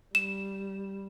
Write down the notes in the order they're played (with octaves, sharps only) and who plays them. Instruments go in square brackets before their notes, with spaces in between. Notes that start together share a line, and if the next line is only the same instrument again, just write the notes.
[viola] G3 [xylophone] E7